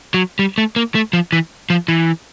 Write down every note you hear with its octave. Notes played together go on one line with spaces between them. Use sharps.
F#3
G3
A3
A#3
A3
F3
E3
F3
E3